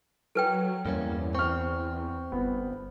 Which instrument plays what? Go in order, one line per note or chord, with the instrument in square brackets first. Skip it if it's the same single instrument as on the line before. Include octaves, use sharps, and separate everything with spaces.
[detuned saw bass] F#3 [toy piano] A4 B4 G5
[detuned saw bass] E2 [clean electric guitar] G2 A#3 C#4
[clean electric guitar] C4 [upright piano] C#6 F6
[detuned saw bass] G1 [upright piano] B3